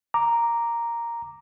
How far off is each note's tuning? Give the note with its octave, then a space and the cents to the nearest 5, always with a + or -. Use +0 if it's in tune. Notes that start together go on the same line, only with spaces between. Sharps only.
A#5 +0 D6 +0